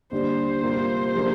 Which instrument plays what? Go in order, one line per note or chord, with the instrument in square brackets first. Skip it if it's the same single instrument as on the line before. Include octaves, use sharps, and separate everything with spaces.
[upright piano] D#2 D3 G3 D4 [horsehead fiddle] C5
[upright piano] C3 G3 A#3 F4
C3 F3 A#3 D4